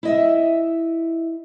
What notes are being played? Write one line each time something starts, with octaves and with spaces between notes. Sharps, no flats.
E4 D#5 E5